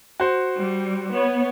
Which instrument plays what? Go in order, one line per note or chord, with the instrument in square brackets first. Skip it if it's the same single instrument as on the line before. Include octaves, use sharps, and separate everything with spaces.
[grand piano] F#4 C5
[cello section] G3
B3 C#5